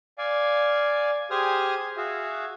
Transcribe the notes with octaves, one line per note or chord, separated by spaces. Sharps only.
D5 F5 G#5
G4 G#4 C5 G#5 D#6 F6
F#4 G#4 E5 F5